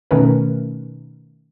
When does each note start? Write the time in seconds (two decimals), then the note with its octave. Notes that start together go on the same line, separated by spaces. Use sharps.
0.11 B2 D#3 A3 C#4 A#4 B4